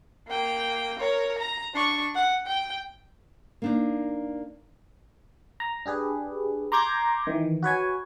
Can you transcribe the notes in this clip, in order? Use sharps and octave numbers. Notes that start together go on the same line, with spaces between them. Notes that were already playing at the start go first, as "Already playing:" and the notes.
A#3 G5
A#4 C#5
A#5
D4 C#6
F#5
G5
A#3 D4 D#4
A#5
D4 G4 G#4 B4
A#5 C6 D6 G6 G#6 A#6
D#3 E3
F#4 B4 C#5 G#5